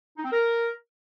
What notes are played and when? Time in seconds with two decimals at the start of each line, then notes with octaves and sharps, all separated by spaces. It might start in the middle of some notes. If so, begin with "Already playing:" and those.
0.18 D#4
0.25 C4
0.32 A#4